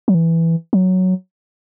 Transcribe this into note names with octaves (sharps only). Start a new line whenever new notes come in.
F#3
E3
F#3